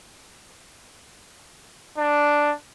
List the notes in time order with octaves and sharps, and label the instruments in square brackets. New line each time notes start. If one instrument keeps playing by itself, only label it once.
[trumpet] D4